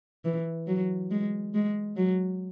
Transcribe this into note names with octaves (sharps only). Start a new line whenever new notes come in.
E3
F#3
G#3
G#3
F#3